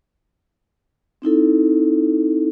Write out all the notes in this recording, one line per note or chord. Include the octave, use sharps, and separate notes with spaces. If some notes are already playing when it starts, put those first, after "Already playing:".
C4 D#4 E4 A4